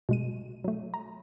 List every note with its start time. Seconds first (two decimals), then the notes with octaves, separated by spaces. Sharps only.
0.09 B2 G#3 D#7
0.64 F#3 A3
0.94 A#5